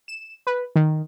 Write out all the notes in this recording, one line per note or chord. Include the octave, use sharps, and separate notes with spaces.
E7
B4
D#3